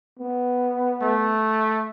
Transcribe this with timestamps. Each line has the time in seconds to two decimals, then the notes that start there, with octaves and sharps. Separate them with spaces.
0.19 B3
1.01 A3